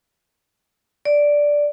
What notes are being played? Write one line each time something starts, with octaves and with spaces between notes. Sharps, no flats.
D5